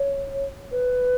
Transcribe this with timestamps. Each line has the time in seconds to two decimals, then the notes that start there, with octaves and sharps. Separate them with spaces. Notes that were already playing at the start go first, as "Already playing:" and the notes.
Already playing: C#5
0.71 B4